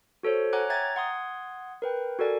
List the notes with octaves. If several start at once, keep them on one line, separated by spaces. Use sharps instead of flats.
F#4 A4 C5 C#5
C#5 F#5 G#5 A#5 D6 F#6
E5 G5 A#5 G#6 A6
F#5 C6 D#6 G#6
A#4 B4 G5
F#4 A4 A#4 D5 G#5